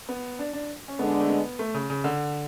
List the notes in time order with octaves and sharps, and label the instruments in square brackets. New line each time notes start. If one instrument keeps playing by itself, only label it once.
[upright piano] B3
D4
D4
C#4
[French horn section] D3 G#3 D4 [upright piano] B3
[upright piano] A3
B3
A3
C#3
C#3
D3